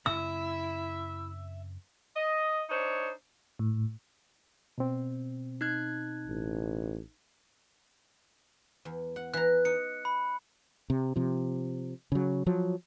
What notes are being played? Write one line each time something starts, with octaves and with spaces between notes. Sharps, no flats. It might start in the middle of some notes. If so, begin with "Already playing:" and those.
F#2 C#3 C4 E4 E5 E6
D#5
D4 D#4 C5 C#5
A2
B2 C4
D#4 F#6 G#6
A1
E2
F#5
E3 A#5 F#6
D#4 C#7
B5
C3
C3 F3
C#3 F#3
F3 F#3